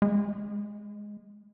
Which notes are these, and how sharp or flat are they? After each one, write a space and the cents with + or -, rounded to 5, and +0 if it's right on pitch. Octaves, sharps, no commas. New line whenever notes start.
G#3 +0